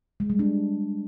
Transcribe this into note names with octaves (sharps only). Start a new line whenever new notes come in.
G#3
G3
D4